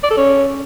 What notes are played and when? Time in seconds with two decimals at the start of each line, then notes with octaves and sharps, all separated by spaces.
0.03 D5
0.10 A4
0.17 C#4